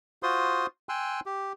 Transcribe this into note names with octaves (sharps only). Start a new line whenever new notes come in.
F4 F#4 C5 C6 D#6
G5 G#5 C6 E6 F#6
G4